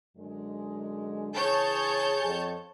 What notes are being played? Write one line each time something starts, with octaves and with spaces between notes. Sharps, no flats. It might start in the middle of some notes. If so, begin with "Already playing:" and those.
F#2 D3 G#3
C#3 E3 G#4 C#5 A5 G6
F2